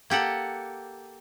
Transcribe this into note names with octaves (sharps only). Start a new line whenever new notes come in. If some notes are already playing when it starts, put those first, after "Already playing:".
A#3 G4 A4 F#5